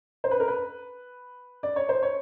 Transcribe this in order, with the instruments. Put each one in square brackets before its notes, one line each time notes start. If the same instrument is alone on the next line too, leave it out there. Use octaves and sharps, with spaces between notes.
[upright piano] C5
B4
A#4
B4
D5
C#5
C5
C#5